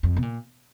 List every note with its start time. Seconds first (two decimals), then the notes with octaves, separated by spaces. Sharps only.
0.03 F2
0.17 B2
0.22 A#2